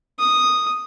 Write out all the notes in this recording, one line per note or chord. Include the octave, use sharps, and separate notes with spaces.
D#6